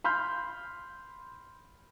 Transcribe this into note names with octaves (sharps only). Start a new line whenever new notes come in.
B5 C6 F6 G6